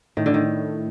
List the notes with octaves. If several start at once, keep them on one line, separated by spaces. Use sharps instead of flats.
A2 D#3
D3
D#3